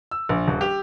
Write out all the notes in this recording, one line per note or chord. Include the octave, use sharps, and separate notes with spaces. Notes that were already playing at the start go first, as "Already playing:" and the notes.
E6
A#1
D#1
G4